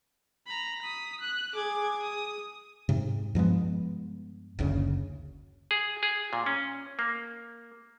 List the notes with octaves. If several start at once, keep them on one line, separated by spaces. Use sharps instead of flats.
A#5 B5
D#6 B6
F#6
G#4 D6 G#6
D#6
G#2 C3
G2 F3 G#3 B3
F#1 D2 C#3
G#4
G#4
A#2
C#4
A#3